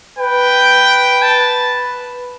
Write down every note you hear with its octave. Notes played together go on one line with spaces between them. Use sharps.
B4 G5
A5